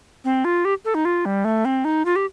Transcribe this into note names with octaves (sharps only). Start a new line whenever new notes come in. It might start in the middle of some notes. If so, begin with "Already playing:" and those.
C4
F4
G4
A4
D#4
F4
G3
A3
C4
D#4
F4
G4